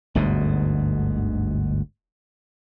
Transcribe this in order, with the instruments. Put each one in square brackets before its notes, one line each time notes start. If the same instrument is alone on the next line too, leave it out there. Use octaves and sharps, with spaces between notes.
[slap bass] G1 D2 G#2 B2